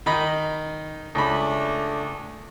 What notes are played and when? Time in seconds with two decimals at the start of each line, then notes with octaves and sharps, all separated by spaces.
0.06 D#3 D#4 B5
1.15 C#2 A3 D4 B5